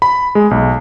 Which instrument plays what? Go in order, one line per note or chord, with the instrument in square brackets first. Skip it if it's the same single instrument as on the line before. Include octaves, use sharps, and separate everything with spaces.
[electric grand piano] B5
G#3
B1